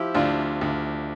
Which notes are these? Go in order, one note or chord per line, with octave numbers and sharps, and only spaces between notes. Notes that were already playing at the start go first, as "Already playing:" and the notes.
Already playing: F3 E4 G4
D2 D4 F4
D2